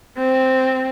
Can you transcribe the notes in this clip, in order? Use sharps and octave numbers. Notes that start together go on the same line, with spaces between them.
C4